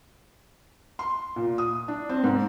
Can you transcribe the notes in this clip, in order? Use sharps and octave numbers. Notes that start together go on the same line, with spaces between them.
C6
A#2
D#6
D4
C4
G#2